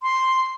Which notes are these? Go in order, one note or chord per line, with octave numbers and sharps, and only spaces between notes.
C6